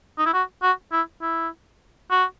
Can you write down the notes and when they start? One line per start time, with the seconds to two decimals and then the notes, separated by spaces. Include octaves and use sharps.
0.18 D#4
0.26 E4
0.33 F#4
0.63 F#4
0.92 E4
1.22 E4
2.11 F#4